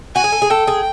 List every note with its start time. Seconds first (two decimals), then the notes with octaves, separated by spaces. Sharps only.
0.16 F#4 G#5
0.24 G#4
0.32 A4
0.42 G#4
0.50 A4 G5
0.68 G#4